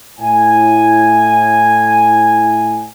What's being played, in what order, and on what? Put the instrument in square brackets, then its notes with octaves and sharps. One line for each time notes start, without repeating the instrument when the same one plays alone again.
[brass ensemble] A2 G#5